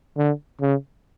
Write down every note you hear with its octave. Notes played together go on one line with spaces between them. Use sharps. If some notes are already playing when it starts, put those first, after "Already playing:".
D3
C#3